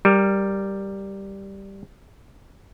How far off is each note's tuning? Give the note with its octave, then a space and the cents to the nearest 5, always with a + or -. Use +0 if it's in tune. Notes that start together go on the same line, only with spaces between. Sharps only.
G3 +0 A#4 +0